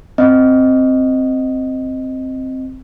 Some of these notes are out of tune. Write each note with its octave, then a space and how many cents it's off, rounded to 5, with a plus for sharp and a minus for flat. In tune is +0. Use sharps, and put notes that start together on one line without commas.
C4 +0 D#5 +0